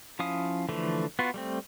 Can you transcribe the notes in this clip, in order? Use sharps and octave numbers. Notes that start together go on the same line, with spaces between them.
F3 C#4 E4 F5 D#6
D3 E3 F3 A3
B3 F4 F#4
G3 A3 C4